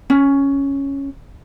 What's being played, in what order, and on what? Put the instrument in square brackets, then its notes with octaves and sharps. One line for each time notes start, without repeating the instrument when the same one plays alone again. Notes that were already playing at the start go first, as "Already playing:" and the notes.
[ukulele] C#4